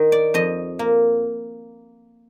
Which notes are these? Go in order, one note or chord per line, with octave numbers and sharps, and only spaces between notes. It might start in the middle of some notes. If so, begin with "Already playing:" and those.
Already playing: D#3
D5
F2 D#5
A#3